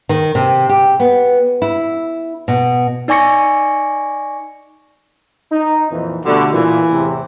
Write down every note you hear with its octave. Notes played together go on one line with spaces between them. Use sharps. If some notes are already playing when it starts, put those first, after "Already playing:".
D#3
C3
G4
B3
E4
B2
D#4 D5 G#5 C#6 A#6 C#7
D#4
F2 A#2 E3
B2 D3 G3 A3 F#4
A#2 E3
E2 A2 C3